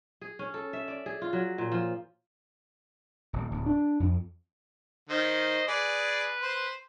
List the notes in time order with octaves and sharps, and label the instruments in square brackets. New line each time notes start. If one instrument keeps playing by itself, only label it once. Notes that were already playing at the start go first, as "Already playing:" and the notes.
[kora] G#4
C#4
A4
E5
D5
G#4
F4
F#3
A#2
F3
[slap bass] D#1
D1
D4
F2
[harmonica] D#3 [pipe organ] C5 D#5
[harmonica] G#4 D5 [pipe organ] B4
[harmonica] C5